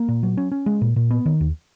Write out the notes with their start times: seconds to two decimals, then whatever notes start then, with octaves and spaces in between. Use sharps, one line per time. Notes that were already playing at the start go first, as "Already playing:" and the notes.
Already playing: A#3
0.08 A#2
0.23 F#3
0.37 C#4
0.52 C#4
0.66 G#3
0.81 A#2
0.96 A#2
1.11 B3
1.26 D#3
1.41 D#2